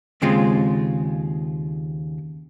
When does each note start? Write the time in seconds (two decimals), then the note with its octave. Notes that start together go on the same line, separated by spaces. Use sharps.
0.22 D#2 C#3 G#3 C4 F4